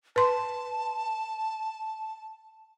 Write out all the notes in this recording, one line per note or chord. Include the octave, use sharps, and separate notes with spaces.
B4 A5 C6